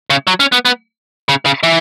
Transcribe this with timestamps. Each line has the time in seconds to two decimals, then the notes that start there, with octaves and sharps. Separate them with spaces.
0.10 C#3
0.27 F#3
0.40 C#4
0.52 B3
0.65 B3
1.29 C#3
1.46 C#3
1.63 E3